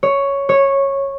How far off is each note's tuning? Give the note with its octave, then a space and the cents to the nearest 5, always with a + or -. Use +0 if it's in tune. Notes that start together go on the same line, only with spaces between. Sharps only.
C#5 +5
C#5 -10